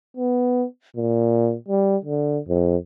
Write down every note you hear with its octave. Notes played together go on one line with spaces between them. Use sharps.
B3
A#2
G3
D3
F2